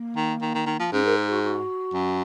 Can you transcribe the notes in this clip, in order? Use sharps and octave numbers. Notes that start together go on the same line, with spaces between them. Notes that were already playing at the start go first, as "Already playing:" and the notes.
Already playing: A#3
D#3
D#3
D#3
D#3
F3
G#2 C#4
A#4
G#4
F#4
F#4
F#2